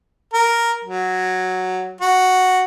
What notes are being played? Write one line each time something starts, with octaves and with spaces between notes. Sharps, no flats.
A#4
F#3
F#4